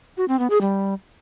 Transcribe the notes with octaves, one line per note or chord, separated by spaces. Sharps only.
F#4
C4
B3
G#4
G3